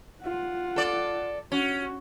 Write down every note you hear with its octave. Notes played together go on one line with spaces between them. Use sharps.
F4 F#5
A4 D5
C#4 F#4